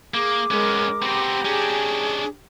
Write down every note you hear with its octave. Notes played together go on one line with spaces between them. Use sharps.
A#3 G#4 D6
G#3 B3 C#4 A#4
B3 C4 G4 A#5
C#4 D4 G#4